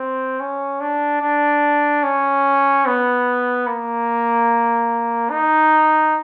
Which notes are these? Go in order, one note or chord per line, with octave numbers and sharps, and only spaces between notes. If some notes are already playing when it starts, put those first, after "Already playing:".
Already playing: C4
C#4
D4
D4
C#4
B3
A#3
D#4